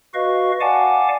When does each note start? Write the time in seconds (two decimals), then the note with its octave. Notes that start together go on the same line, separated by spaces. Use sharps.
0.14 F#4 B4 D#5 F5 C#6
0.61 D5 F5 F#5 G#5 A5 D6